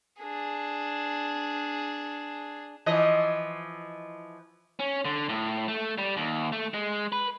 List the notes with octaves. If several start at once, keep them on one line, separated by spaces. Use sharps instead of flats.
D4 G#4
E3 F3 D#5
C#4
D3
A2
A3
G3
D#2
A3
G#3
B4